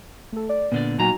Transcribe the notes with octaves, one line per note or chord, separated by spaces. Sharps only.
A3 A4
D5
A#2 D3 B3 D5
A#2 F#3 D#4 F#4 G#5 A#5